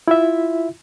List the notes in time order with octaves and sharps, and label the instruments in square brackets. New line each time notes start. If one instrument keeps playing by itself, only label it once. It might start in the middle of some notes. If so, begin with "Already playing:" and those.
[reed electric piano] E4 F4 E5